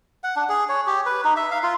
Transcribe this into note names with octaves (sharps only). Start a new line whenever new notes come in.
F#5
D4
G#4
C#5
G4
B4
D#4
E5
F5
F4